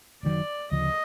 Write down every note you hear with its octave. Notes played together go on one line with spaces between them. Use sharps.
F#1 F#2 D#3 F#3 D5
D2 C#3 F3 D#5